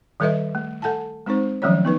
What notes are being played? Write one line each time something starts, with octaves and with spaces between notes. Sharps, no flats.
D#3 G3 A4 B4 D#5 E5
A3
A4 F#5 G#5 A5
G#3 C4 D#4 C5
D#3 F3 F#3 A3 C#4 C#5
B3 D#4 B4